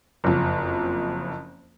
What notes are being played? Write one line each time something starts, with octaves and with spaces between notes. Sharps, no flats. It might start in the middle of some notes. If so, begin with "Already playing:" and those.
F#1 F2